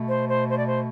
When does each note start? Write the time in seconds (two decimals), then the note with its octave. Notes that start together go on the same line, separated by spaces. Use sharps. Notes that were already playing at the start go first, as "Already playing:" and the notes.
Already playing: B2 A3
0.09 C5
0.30 C5
0.50 C5
0.58 D5
0.68 C5